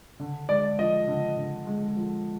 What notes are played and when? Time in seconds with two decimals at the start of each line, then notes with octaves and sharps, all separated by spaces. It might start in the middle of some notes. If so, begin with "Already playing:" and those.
0.20 D3
0.49 G#3 D5
0.79 F3 D#5
1.08 D3
1.37 D3
1.67 G#3
1.97 F3